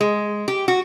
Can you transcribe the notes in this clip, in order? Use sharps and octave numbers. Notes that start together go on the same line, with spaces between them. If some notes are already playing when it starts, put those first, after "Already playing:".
G#3
G4
F#4